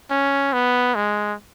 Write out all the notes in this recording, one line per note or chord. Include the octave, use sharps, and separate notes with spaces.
C#4
B3
G#3